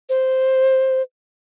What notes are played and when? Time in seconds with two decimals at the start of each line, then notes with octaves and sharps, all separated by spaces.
0.09 C5